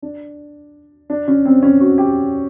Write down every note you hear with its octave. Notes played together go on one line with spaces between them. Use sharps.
D4
D4
C#4
C4
C#4
F#4
G4